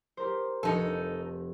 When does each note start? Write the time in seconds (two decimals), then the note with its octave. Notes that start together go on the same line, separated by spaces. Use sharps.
0.17 G4 A#4 C5
0.63 F1 D#4 A4 C#7